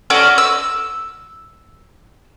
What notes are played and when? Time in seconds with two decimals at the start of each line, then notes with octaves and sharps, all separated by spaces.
0.10 C#4 F#4 A4 D5
0.38 E6